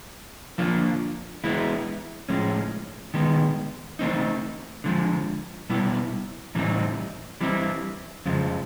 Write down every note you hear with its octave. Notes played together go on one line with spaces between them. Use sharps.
D3 F3 A#3 D4 F4
E3 G#3 B3 E4
A2 F3 G#3 C#4
D#3 G#3 B3
E3 A3 C4 D#4
D3 F3 G#3
B2 G3 B3 E4
A2 E3 G3 C4 D#4
E3 G3 C4 E4
F2 C#3 F3 G#3